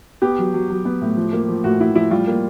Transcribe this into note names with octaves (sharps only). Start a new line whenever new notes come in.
B3 G4
F#3
F#3
F#3
B3
A2
F3
A#3
F3
A2 F#4
A2 E4
F3 E4
G3 F4
A#3